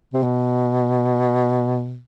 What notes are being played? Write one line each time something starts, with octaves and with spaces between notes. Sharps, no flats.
C3
B2